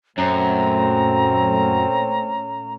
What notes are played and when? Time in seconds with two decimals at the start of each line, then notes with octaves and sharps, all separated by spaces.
0.18 F#2 A#2 A3 C4 C#4 A#5